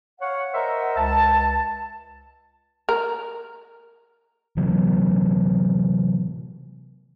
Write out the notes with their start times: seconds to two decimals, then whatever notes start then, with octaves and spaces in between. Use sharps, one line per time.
0.21 C#5 F5 F#5
0.53 A#4 C5 D#5 E5 F#5
0.97 C#2 A5
2.89 A#4
4.57 C3 E3 F#3 B3